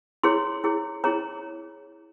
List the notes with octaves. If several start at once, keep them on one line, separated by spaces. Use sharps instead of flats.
E4 G#4 C#5 C6
E4 G#4 C#5
E4 G#4 C#5 A#5